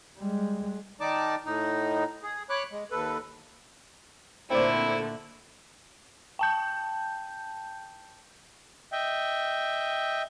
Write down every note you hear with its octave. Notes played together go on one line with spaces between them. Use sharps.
G3 G#3
D#3 D#4 D5 A5 D6
A2 D#4
G#4
C#5 B5 D6 F#6
G#3
D#2 A4 B4
A#2 D3 A3 C4 E4 C5 D5
G5 A5 G6
D#5 E5 G5